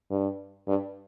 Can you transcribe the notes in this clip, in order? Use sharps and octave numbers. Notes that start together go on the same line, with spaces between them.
G2
G2